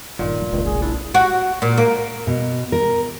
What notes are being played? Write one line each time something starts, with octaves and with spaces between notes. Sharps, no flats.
G1 F#2 A#2 D#3
D2 F3
F1 C#2 C#3
B1 G#4
D4 E4
F#4
A#2
A#3
B2
A#4